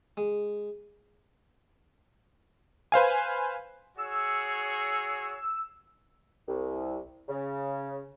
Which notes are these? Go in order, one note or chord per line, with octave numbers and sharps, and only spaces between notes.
G#3
B4 C5 F5 G#5
F#4 G#4 C#5 E6
C2
C#3